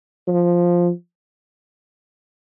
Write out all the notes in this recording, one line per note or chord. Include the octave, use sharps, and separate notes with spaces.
F3